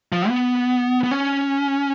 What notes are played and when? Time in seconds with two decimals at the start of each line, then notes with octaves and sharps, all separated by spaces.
0.12 F3
0.29 B3
1.04 B3
1.11 C#4